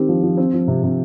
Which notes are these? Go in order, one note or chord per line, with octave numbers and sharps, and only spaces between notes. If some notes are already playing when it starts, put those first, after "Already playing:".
Already playing: D#3 C4 G4
F3
F3
C4
F3
C3
C3